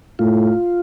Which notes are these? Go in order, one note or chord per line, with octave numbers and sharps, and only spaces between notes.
A2 F4